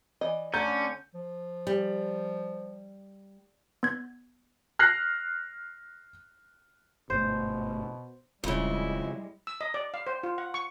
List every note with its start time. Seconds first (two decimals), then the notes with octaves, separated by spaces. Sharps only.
0.21 E3 D5 D#5
0.54 D3 A3 C#4 A#5 G6
1.15 F3
1.67 G3
3.83 B3 G#6
4.79 F6 F#6 A#6 C7
7.10 G1 G#2 B2 A3 C5
8.44 D#1 F2 C#3 G3 G#3 E4
9.47 E6
9.61 D#5
9.74 D5
9.94 F5
10.07 C5
10.23 F4
10.38 F#5
10.54 C#6